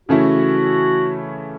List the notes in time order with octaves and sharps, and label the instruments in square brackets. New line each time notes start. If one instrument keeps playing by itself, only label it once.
[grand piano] C#3 E3 A3 C#4 E4 [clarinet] F#4